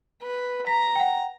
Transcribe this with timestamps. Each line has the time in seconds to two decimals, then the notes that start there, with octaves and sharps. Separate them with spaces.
0.23 B4
0.67 A#5 B6
0.95 F#5 G5